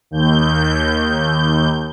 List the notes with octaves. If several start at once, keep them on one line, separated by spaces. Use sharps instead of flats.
D#2 G6